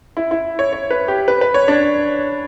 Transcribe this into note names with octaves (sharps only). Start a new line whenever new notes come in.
E4
E4
C#5
C#5
B4
G4
B4
B4
C#5
D4